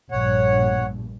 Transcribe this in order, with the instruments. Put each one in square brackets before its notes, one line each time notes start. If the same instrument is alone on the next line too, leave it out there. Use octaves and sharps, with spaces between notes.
[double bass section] A#1 G2 [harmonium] C#5 F#5